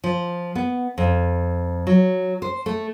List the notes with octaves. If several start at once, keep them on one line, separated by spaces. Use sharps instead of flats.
F3
B3
F2
F#3
C5
A3